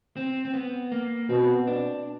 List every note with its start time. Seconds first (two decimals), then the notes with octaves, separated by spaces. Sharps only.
0.17 C4
0.45 C4
0.54 B3
0.92 A#3
1.29 B2 C4
1.67 D4